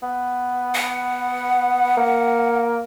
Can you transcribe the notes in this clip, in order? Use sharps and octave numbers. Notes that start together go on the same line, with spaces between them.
B3
F#5
A#3